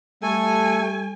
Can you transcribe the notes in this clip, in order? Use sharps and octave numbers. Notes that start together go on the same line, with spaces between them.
G3 A3 A4 G#5